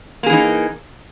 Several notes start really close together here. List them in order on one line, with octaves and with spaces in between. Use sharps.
A#3 G#4 E3 D#4